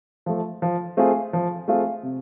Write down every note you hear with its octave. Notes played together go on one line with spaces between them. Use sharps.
F3 A3
F3
A3 C4 F4 G#4
F3
A3 C4 F4 G#4
C3